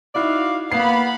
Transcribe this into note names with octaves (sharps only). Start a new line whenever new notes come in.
D#4 E4 F#4 D5 F5
A#3 B3 F5 F#5 B5 C7